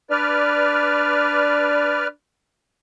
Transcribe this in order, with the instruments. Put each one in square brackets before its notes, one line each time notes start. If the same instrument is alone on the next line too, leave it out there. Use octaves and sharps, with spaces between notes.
[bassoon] D4 [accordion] B4 D5 F6